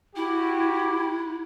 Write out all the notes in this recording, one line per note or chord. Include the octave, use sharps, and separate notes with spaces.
E4 F#4 G4